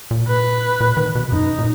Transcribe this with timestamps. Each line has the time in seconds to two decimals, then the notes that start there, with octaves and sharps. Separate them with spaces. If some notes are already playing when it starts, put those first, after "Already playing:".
0.11 A#2
0.28 B4
0.80 A#2
0.97 D#3
1.15 B2
1.32 F#2 D#4
1.58 A#2